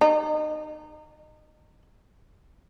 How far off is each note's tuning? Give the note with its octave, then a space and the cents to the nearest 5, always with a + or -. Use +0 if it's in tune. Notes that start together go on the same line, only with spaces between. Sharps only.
D#4 -25